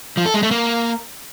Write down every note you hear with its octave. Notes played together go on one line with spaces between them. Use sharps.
F3
A4
G#3
A3
A#3